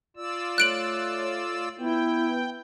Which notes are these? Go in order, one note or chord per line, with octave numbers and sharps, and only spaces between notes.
F4 D5 E6
A3 C#5 F#6 D7 F#7
B3 E4 G5